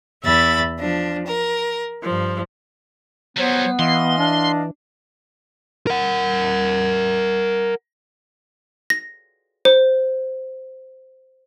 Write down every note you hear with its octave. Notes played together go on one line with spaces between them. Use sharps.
E2 E5 B5 A6
F3 D4
A#4
G2 F3
F#3 G3 B3 C5 C#5
E3 D#5 F5 C6
D4
A#4 F#5
A#6
C5